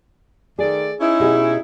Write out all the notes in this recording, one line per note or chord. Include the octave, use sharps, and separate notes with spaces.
D#3 A3 G#4 D5
C#4 D#4 E4
B2 G4 G#4